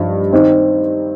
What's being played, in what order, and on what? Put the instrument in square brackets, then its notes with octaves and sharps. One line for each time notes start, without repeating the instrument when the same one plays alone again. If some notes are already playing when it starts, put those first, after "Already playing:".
Already playing: [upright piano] G2 F3 D#4
D#3 C4 D#4